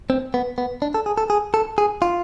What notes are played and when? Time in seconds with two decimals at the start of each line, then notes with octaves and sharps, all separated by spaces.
0.10 C4
0.34 B3
0.58 B3
0.82 D4
0.94 A4
1.06 G#4
1.18 A4
1.30 G#4
1.54 A4
1.78 G#4
2.02 F4